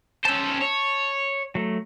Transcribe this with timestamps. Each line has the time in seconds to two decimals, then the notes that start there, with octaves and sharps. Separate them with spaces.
0.25 C#4 C5 A5 E6
0.62 C#5
1.55 F#3 A3